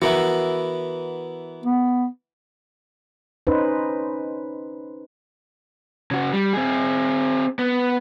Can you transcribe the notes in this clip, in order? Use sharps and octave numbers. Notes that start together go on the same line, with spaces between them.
E3 B3 F#4 A#4 E5
B3
C#4 D#4 B4 C5
C#3 F#4
G3
C4 G#4
B3